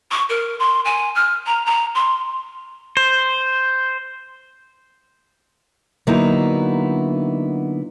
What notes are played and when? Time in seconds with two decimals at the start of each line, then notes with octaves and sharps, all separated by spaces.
0.11 C#6
0.29 A#4
0.59 C6
0.85 G#5
1.15 F6
1.46 A#5
1.65 A#5
1.95 C6
2.97 C5
6.07 D3 F#3 A#3 B3 D#4 E4